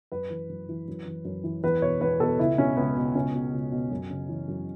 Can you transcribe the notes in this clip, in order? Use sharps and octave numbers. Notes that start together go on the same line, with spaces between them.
F#2 B4
E3
F#2
E3
F#2
E3
F#2
E3
E2 B4
B2 C#5
E2 B4
B2 A4
C#2 E4
B2 C#4
C#2 B3
B2
C#2 C#4
B2
C#2
B2
F#2
C#3
E3
F#2